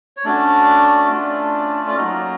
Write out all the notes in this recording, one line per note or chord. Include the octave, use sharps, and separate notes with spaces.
C#5
A3 C#4 D4 F#4 D5
A3 C#4 F4
D5
F#3 A#3 C#4 D#4 F#4 D#5